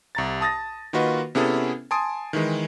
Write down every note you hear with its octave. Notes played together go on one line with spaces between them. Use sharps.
C2 A#5 A6
A5 D#6 A6 A#6
D#3 A#3 F4 F#4 B4 D#5
C3 B3 C#4 E4 G#4 A4
G#5 A5 C6 D#6 D7
D#3 E3 G#3